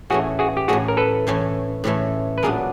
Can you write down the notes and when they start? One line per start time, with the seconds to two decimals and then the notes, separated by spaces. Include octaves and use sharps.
0.10 A2 E3 A3 C#4 F#4 G#4
0.39 F#4 G#4
0.57 G4
0.68 A2 E3 A3 C#4 F#4 G#4
0.88 A#4
0.97 A4 B4
1.27 A2 E3 A3 C#4
1.84 A2 E3 A3 C#4
2.38 B4
2.43 A#2 F#3 B3 D4 G#4 A#4